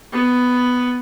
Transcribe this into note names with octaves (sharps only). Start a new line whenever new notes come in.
B3